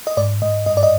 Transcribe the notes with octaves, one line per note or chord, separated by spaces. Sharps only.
D#5
G#2 D5
G#2 D#5
G2 D#5
D5
D#5